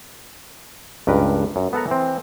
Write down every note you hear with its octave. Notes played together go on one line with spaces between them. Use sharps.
C#2 G2 A#4 B4
F#2
B3 A4 F#5 A#5
E3 C4